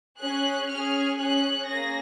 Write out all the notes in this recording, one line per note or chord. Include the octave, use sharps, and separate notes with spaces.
C#4 G#4 F#6
C#4 G#4 F6
C#4 G#4 F#6
A#3 C#4 G#4 A#6